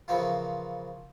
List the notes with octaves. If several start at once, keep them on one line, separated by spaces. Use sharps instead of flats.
A#2 C#3 E3 F3 B3 C4